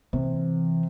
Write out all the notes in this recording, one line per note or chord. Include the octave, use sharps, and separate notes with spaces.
C3 E3